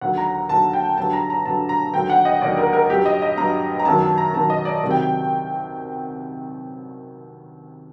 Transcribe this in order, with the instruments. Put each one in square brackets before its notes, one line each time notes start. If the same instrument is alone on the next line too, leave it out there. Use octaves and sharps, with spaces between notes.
[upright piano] D#2 D3 F#3 F#5
A#5
A#5
D#2 D3 F#3 A5
G5
G2 D3 F#3 A5
A#5
A#5
G2 D3 F#3 A5
A#5
D#2 D3 F#3 G5
F#5
D#5
D#2 D3 F#3 D5
A#4
A#4
G2 F#3 G4
D#5
D#5
G2 F#3 A#5
A#5
F#2 D#3 F#3 A5
A5
A#5
F#2 D#3 F#3 A5
D#5
D5
C2 C3 D#3 F#3
G5